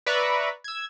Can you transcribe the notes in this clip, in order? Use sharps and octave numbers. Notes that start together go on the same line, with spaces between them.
B4 D5 E5 A#5 B5 C#6
E6 G#6